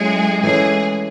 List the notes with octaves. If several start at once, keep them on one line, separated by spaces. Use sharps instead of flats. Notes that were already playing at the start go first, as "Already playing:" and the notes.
Already playing: F#3 G#3 A3 C#4 E4 G#4
E3 G#3 A3 C#4 G#4